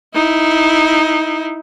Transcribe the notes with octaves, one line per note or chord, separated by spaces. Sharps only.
D#4 E4